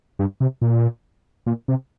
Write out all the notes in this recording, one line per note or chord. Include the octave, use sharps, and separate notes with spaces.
G2
C3
A#2
A#2
C3